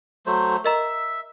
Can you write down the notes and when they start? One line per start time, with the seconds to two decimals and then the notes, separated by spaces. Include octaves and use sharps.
0.26 F#3 A3 C5
0.64 A#4 D#5 E5 A#5